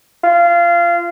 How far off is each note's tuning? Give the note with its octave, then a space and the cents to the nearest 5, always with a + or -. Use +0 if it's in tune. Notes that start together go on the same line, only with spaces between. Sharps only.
F4 -20